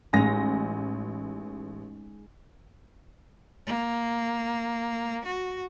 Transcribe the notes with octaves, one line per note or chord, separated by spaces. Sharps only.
A1 G#3 D#4 A#6
A#3
F#4